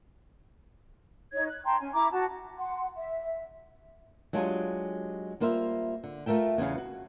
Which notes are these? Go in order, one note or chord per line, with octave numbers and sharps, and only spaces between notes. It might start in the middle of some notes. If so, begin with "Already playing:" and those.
D#4 C#5 G#6
F#6
G5 A5 A#5 C6
C#4 G#5
E4 A#5 D6
F#4 A5
F#5 C6
E5
F#3 G#3 D4 F4 G4 G#4
G3 A#3 F4 C5 E5
D3
A3 F4 A#4 E5 G5
E2 C#3 B3 F5
F#4